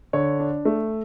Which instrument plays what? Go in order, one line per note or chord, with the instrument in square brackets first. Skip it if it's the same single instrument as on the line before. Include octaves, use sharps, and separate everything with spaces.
[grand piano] D3 C#5
D4
A3